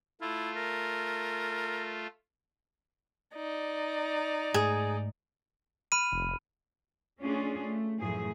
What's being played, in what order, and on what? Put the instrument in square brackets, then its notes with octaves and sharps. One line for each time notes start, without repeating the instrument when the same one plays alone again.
[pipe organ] A3 F4 [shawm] E4
[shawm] A#4
[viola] D#4 D5
[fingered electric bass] G#2 A3 [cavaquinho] G#4
[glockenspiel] B5 F6 D#7
[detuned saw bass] F1
[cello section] A3 C#4 D4 F4 G#4
A3
F#2 A2 E3 F3 A3 G#4